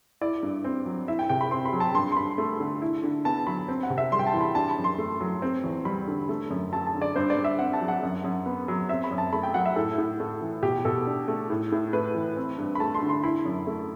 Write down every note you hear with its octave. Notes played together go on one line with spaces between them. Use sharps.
E4 D5
G2
C4
F#3
E4 E5
G5
C3 G5
B5
C4 C6
B5
F#3
A5
G2 C6
C6
G2 B5
A3
D3
E4
D3
B3 A5
F#3 B5
C4
F#5
C3
E5
G3 C6
G5
A5
E3
B5
D4 A5
B5
F#2
C6
A3
F#3
C4
E2
G3 B5
D3
A3
F#2
F#3 A5
A5
D3
D5
G2 C5
D5
G2
E5
C4 F#5
A5
F#3
F#5
F#2
F#2
B3
F#3
C4 E5
B5
F#2
A5
A3 B5
G5
F#3 F#5
E5
A2 A4
A2
A3
E3
B2 G4
B2 A4
D4
A3
A2
A2
A3 B4
E3
C4
G2
B5
A3 A5
C6
D3
C6
E4 B5
F#2
A3